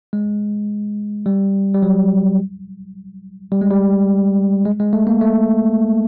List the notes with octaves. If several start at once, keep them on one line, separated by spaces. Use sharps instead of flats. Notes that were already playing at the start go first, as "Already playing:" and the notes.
G#3
G3
G3
F#3
G3
G#3
G3
G#3
G#3
A3
A#3
A3